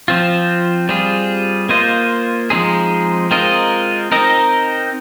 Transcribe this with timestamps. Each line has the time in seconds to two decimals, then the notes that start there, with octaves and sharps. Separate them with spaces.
0.08 F3 C4 F4
0.89 G3 C4 F4 G#4
1.69 A#3 F4 C5 D#5
2.50 F3 G#3 C4 D#4 G#4
3.31 G#3 C4 F4 A#4 D#5
4.12 C4 D#4 A#4 D#5